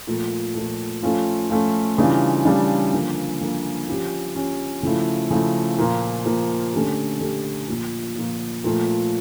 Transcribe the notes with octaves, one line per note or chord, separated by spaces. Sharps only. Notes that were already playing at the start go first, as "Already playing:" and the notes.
A#2 F3 A3
A#2 F3 A3
F3 A3 C#4 F4
F3 A3 C#4 F4
C#3 E3 G3 D4 F4
C#3 E3 G3 D4 F4
D3 F3 A#3
D3 F3 A#3
F3 C#4 G4
F3 C#4 G4
C#3 F3 A3 E4
C#3 F3 A3 E4
A#2 F3 A#3
A#2 F3 A#3
D3 A3 C#4 G4
D3 A3 C#4 G4
A#2 F3 A#3
A#2 F3 A#3
A#2 F3 A3